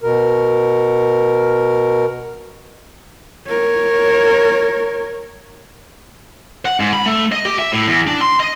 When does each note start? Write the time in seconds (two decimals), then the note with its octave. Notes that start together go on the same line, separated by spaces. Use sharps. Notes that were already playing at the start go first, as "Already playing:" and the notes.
0.03 B2 A#4
3.47 A#4 C#5
6.65 F#5
6.80 G#2
6.93 B5
7.06 A3
7.32 D#5
7.45 G4
7.59 E5
7.72 A2
7.88 E2
8.07 D4
8.21 C6
8.40 D#5